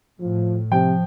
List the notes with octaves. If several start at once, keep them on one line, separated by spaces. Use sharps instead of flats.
A2 F3
C3 F3 G5